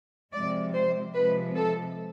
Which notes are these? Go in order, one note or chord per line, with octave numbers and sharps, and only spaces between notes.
C3 F3 G#3 D5
C5
C3 F3 G#3 B4
A4